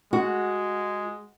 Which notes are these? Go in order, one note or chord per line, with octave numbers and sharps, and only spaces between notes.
G#3 F#4